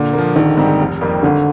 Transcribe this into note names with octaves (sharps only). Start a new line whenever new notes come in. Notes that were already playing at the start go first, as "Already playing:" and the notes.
Already playing: A#2 D3
A#3
F3
A#1 D#3
G#2 G3 C4
F1
F2 D#3 G3 A#3
G#1 D3